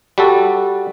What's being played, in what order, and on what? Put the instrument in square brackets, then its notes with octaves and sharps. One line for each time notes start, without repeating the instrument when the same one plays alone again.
[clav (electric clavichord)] G3 F#4 A4